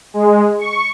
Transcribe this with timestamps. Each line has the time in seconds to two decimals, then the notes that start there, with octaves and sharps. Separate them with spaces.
0.14 G#3
0.58 C#6